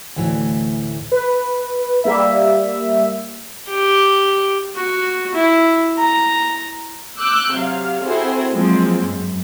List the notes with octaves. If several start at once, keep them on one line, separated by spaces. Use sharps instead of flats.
D2 A2 E3
B4
G3 A#3 E5
G4
F#4
E4
A#5
D6 E6 F#6 G6
C3 F#3 F5
C4 E4 F#4 G#4 A4 C5
F3 F#3 G#3 A#3 C4
F#2